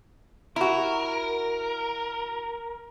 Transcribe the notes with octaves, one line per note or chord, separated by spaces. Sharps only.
E4 F#4 A#4